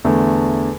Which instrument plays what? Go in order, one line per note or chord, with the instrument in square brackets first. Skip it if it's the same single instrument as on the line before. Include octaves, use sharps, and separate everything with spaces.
[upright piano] E2 D3 A3